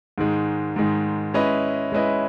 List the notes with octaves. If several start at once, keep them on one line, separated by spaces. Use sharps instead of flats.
G#2 D#3 G#3
G#2 D#3 G#3
G#3 C#4 E4 B4 D#5
G#3 C#4 E4 B4 D#5